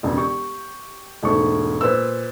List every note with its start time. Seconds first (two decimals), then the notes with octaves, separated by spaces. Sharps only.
0.03 E1 C#2
0.16 G4 C#6
1.23 E1 G#2 A3 C#6
1.81 A#2 B4 C5 E6